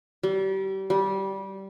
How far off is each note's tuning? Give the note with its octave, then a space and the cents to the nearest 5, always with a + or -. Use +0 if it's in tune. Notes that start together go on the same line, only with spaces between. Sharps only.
G3 -30
G3 -15